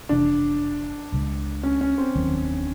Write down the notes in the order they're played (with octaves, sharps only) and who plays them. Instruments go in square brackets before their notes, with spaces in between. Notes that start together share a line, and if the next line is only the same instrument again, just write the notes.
[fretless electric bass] F1 F2 C3 E3 [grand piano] D4
[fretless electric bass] C#2 C#3 F3 G#3
[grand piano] C#4
C#4
C4
[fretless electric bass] F1 D#2 D#3 F#3